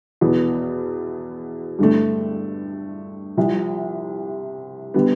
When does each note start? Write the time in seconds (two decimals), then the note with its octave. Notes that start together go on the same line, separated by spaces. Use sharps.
0.21 E2 B2 B3
1.79 G2 D3 A3
3.37 C2 C3 F3
4.94 D3 G3 B3